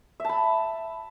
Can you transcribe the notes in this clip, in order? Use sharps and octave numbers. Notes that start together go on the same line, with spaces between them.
E5 A5 B5